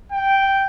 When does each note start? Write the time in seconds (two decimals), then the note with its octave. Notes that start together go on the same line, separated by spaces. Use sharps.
0.12 G5